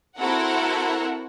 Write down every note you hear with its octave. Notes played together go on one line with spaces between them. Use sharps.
C4 E4 F#4 A4 A#4 F#5